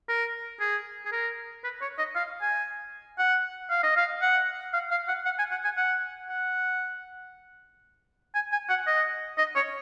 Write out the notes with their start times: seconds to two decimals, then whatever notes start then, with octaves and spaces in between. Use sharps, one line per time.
0.09 A#4
0.60 G#4
1.06 G#4
1.12 A#4
1.64 B4
1.82 C#5
1.98 D#5
2.15 F5
2.42 G#5
3.19 F#5
3.70 F5
3.83 D#5
3.97 F5
4.22 F#5
4.74 F5
4.91 F5
5.08 F#5
5.25 F#5
5.39 G#5
5.51 F#5
5.64 G#5
5.77 F#5
6.29 F#5
8.35 G#5
8.52 G#5
8.69 F#5
8.87 D#5
9.38 D#5
9.56 C#5